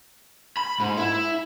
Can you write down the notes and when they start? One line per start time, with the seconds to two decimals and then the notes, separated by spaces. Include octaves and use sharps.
0.57 B5
0.80 G#2
0.97 E4